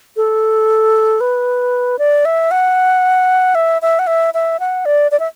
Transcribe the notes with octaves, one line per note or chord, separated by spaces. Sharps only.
A4
B4
D5
E5
F#5
E5
E5
F#5
E5
E5
F#5
D5
D5
E5